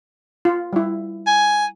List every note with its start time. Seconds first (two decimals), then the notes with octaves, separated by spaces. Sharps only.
0.45 F4
0.73 G3 E4
1.27 G#5